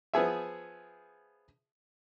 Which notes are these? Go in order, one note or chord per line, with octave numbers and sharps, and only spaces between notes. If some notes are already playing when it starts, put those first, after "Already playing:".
F3 B3 G#4 E5